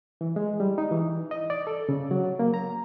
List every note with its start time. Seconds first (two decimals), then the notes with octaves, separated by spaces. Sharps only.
0.21 E3
0.36 G#3
0.60 G3
0.78 D#4
0.91 E3
1.31 D#5
1.50 D5
1.67 A4
1.89 C#3
2.11 F#3
2.39 A#3
2.54 A#5